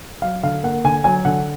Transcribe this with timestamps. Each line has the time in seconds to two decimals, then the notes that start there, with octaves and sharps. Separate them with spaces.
0.22 F#3 F5
0.43 D3 F5
0.63 A#3 F#5
0.84 D3 G#5
1.04 F#3 G#5
1.25 D3 F#5